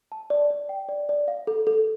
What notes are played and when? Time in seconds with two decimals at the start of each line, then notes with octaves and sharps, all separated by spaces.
0.12 A5
0.30 D5
0.50 D5
0.69 G5
0.89 D5
1.09 D5
1.28 F5
1.47 A4
1.67 A4